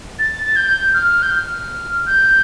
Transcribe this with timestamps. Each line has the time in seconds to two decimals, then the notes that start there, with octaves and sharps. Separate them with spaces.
0.19 A6
0.45 A6
0.56 G6
0.94 F6
1.22 G6
1.31 F6
2.06 G6